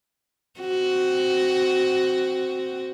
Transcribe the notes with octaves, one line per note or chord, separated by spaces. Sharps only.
C4 F#4